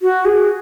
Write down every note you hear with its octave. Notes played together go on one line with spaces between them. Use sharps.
F#4
G#4